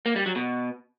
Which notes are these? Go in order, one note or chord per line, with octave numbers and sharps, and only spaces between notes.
A#3
G3
F#3
B2